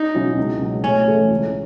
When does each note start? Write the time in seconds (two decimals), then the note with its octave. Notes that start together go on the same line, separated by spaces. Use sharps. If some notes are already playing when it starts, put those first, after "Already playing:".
Already playing: D#4
0.14 B2 F#3 C#4 E4
0.37 C#2
0.61 B2 F#3
0.84 A2 C#4
1.08 E3 A3
1.31 C#2